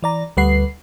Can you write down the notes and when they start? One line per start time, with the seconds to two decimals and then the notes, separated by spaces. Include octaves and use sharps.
0.03 E3 D5 A#5
0.37 D2 G3 B4 F#5 C7